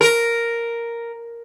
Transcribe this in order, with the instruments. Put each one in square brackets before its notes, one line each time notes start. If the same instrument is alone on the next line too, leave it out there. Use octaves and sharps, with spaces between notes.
[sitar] A#4